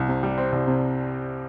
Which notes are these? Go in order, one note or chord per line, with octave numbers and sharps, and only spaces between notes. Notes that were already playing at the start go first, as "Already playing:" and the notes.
Already playing: C2
C3
G3
C4
C2
C3